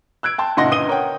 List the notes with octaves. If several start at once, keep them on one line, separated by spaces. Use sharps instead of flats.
E6 F#6 G#6 D7
G5 A5 C6
F#1 A#2 D#4 F#5 C6 A#6
G1 D#6 D#7 G7
A#4 C#5 F#5 G5